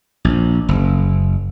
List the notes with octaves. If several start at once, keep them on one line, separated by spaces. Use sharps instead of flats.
A#1
F#1